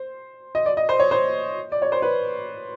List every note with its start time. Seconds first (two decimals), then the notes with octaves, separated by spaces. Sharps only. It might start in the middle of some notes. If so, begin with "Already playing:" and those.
Already playing: C5
0.55 D#5
0.66 D5
0.77 D#5
0.89 C5
1.00 C#5
1.11 C5
1.72 D5
1.82 C#5
1.92 C5
2.02 B4